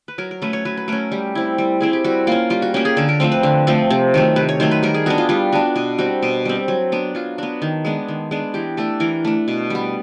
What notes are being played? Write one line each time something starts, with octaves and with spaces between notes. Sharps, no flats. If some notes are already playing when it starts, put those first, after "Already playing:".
B4
F#3 A#4
A#4
A3 C#4 B4
C#5
F#3 B4
B4
A3 C#4 A#4
G3 G4
C4 E4
G3
C4 E4 G#4
G4
G3 F#4
A#3 C#4 F4
G3 F4
F#4
A#3 C#4 G4
G#4
D3 A4
A#4
F3 A3 C4
B4
D3
F3 A3 C4
C3
D#3 F#3 A3
C3 B4
C#5
D#3 F#3 A3 C5
B4
G3 A#4
G#4
B3 D4 F#4
F4
G3 F4
B3 D4 F#4
B2 F#4
G3 C4 F#4
B2
G3 C4
F#3
B3 D4
F#3 F4
B3 D4 F#4
D#3
G#3 B3 D4
D#3
G#3 B3 D4
E3 G4
A3 D4 A4
E3 A#4
A3 D4
B2
G3 B3